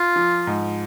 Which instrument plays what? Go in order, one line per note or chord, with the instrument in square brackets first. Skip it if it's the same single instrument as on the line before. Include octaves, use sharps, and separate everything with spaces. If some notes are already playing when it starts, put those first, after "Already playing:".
Already playing: [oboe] F4
[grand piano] F3
G#2